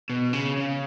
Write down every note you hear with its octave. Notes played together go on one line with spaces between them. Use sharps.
B2
C#3
C#3